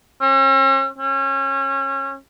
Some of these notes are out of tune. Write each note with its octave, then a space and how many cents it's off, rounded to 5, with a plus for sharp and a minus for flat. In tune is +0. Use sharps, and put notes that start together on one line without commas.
C#4 -45
C#4 -25